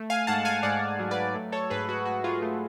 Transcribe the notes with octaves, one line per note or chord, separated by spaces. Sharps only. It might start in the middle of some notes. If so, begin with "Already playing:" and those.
Already playing: A3
F5 G#5
G#2 F#5 A5
F5 G#5
G#2 D5 F#5
F#3
B4 D5
A3
A4 C#5
G#2 G#4 B4
F#4
A3 F#4
F4 G#4
A3